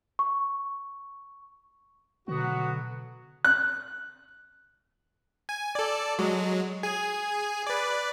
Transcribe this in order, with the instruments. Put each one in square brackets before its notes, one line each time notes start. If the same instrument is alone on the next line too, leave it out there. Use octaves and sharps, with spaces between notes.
[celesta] C#6
[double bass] B2 [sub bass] D3 [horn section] F#3 B3 F#4
[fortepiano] F#6
[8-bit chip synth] G#5
A4 D5
F#3 G#3
G#4 G#5
B4 D5